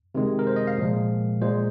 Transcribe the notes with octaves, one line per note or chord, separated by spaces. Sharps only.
C3 D#3 G#3
A#4
C5
D#5
F5
A#2 F3 G#3
A#2 G#3 C5